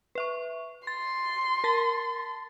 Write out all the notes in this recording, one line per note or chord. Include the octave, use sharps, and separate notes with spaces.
B4 E5 C#6
C6 A6
A#4 A5 A6